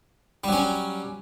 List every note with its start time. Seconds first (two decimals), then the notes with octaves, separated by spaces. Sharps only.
0.44 G3
0.48 F#3
0.52 C#4